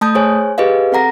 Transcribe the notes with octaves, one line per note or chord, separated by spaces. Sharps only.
A3 A5 D#6 G6
G#4 C5 C#5 G#5
G4 G#4 B4 D#5 F5
C4 A4 F#5 A#5 A#6